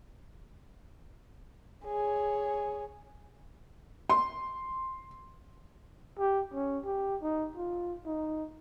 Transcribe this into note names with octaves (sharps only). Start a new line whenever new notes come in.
G#4 C#5
C6
G4
C#4
G4
D#4
F4
D#4